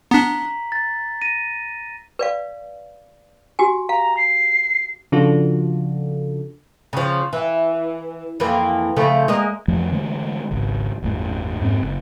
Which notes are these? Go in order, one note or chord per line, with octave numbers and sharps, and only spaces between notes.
B3 D4 A#5 B6 F#7
A6
A#6 D#7
B4 D5 F5
F#4 G4 G#5
F5 A#5
C7
C#3 F3 D4 F4 F#4 A4
C#3 F3
E3
F2 E3 A#3
C#3 F3 A3
G#3 A#3 D#5
F2 E3 F3 A3
D3 E3 G#3 A3
G#1 C#2
G1 E2 A2
F2 G#2 B3 C4
F#1